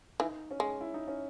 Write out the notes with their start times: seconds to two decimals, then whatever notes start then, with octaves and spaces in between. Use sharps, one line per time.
0.20 E3 D#4
0.51 C#4
0.60 G#3
0.81 E4
0.94 D#4
1.08 C#4